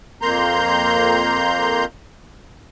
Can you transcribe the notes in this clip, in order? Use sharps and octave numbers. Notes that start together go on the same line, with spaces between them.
F2 A#3 A#5 C6 G6